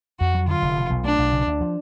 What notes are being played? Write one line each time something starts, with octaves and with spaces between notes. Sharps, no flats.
F2 F#4
F#3
D3 F4
F1
B2
B1
A3 D4
B1
C#3
D2
F3